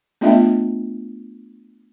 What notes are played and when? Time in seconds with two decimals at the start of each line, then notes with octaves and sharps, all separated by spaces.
0.21 A3 B3 D4 F4 D#5 E5